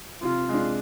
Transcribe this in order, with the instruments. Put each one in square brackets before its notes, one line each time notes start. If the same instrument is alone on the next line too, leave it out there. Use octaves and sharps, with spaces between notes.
[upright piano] C3 [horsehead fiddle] F4
[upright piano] G#3 D4